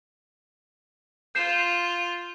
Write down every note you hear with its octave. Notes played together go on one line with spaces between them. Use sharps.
F4 G6 C7 E7